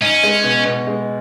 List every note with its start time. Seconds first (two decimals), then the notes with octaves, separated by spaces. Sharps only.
0.01 C#4 D#4
0.23 G#3
0.44 B2
0.65 B2
0.87 G#3